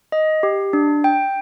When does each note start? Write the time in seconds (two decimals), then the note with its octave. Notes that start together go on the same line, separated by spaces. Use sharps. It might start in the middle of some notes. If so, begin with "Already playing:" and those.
0.12 D#5
0.43 G4
0.73 D4
1.04 G5